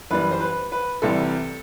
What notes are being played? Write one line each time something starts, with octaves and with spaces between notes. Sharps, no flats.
F#2 E3 G3 B4
C5
B4
B4
C2 C3 E3 G3 A4